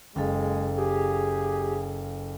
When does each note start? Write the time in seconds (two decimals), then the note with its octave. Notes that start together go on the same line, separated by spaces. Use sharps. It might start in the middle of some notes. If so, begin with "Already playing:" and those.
0.16 F#1 G#3 A4 F5 G5
0.78 G4 G#4